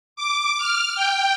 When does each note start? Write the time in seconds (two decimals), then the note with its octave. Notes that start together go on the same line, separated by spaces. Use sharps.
0.16 D6
0.58 F6
0.95 G5